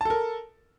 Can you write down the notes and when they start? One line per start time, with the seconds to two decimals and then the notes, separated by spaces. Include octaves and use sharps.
0.01 A5
0.05 A4
0.10 A#4